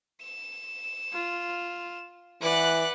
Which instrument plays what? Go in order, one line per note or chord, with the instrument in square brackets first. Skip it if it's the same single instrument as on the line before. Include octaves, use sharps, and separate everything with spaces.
[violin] E7
[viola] F4
[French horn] E3 [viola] B4 F#5 [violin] D5 F#6